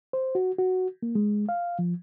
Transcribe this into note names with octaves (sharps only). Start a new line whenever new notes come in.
C5
F#4
F#4
A#3
G#3
F5
F3